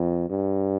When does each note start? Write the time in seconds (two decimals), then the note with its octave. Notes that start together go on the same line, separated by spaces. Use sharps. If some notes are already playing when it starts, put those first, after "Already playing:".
Already playing: F2
0.30 G2